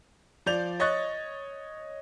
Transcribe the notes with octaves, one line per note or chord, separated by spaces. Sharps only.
F3 D5 G6 F7
C#5 D#5 C#6 F#6 A6